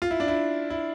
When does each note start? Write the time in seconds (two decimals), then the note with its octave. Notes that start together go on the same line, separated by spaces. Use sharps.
0.02 F4
0.11 E4
0.20 D4
0.28 E4
0.70 E4